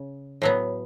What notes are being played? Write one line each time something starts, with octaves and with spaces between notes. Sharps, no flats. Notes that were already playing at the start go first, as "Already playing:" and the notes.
Already playing: C#3
A2 F#3 B3